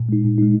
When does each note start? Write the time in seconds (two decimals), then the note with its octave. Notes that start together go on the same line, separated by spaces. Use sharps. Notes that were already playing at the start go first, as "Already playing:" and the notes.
Already playing: A#2
0.09 G#3 D#4
0.24 A#2
0.38 G#3 D#4